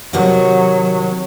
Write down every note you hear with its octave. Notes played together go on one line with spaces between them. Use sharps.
C3 D#3 F#3 F#4